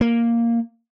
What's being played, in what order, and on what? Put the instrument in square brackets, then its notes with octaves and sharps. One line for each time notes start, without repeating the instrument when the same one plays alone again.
[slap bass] A#3